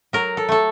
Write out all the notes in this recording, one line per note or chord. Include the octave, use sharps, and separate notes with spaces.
F#3 A#4
A4
A3 A4